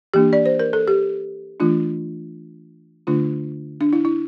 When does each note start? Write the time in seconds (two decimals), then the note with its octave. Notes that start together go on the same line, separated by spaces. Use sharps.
0.14 E3 A#3 D4 G4
0.33 D5
0.46 C5
0.59 A#4
0.73 A4
0.88 G4
1.60 E3 A3 D4 F4
3.07 D3 A3 D4 F4
3.81 D4
3.93 E4
4.05 E4